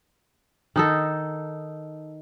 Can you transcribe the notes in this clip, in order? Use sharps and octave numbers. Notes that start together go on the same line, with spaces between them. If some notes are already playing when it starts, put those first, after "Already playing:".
D#3 D#4 A4